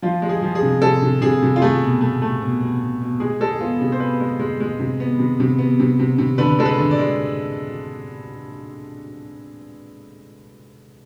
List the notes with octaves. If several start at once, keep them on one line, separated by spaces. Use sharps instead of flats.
F3 F4
G#3
G#4
F3
G#4
C3
C3 A4
C3
C3 G#4
C3
F4
A3 G#4
B2
A3
A3
B2
B2
B2
B2
G#3 G#4
G#3 A4
G#4
B3 F4
C3 G#4
C5
B3 B4
G#3
G#3
G#3
C3
B3
C3
C3
B3
C3
C3
C3
D3 B4
G#3 A4
B4
D3
D5
G#3